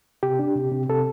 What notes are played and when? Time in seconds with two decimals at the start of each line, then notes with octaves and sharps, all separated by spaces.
0.23 C3 G4
0.39 D4
0.56 C3
0.72 C3
0.89 C3 A4